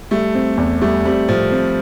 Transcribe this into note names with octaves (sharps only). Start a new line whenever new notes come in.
G3 A3
C4
E2
G3 A3
G3 C4
A2 F3
C4